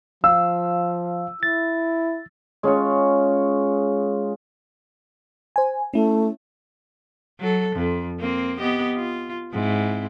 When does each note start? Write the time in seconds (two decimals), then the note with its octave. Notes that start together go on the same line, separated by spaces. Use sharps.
0.24 F3 F5 E6
1.43 E4 A6
2.63 G#3 C#4 F4 C#5
5.56 C5 G#5
5.94 A3 C#4 E4
7.40 F#3 A4
7.76 F2
8.20 A#3 C4
8.58 B3 G4 D#5
8.96 F4
9.53 G#2 C4 E4